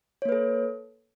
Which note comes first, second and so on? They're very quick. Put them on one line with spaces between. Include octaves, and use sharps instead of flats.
C#5 A#3 B4 A4